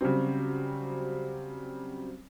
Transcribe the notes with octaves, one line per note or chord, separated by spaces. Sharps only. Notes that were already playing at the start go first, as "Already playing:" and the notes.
C#3 F#3 G3 C4